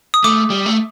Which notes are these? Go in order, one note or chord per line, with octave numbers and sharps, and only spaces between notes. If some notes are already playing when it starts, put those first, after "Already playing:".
D#6
A3 D6
G3
A3